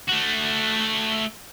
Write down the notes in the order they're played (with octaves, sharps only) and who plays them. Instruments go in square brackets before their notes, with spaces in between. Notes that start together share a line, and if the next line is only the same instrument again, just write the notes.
[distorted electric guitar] A3 F#4